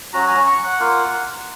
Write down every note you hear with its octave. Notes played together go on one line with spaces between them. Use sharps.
F#3 C#4 F#4 A#5
G#5
A#5
C#6
F#5
A#3 F4